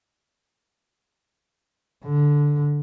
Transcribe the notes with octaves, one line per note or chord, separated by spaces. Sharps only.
D3